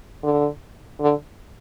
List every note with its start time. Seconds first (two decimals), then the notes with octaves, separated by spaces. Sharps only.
0.23 D3
1.00 D3